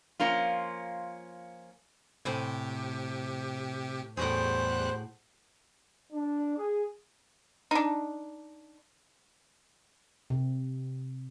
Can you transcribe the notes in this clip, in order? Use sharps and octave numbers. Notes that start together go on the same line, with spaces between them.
F3 A#3 C#4 F4
A2 C3 G4 C5 G#5
E2 A2 G3 F#4 G#4 C5 F#6
D4
G#4
D4 D#4
C3